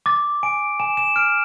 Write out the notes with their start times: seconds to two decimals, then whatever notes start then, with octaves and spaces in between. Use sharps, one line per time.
0.06 D6 A6
0.43 G#5 D7
0.80 G#5 E7
0.97 E7
1.16 F6 D7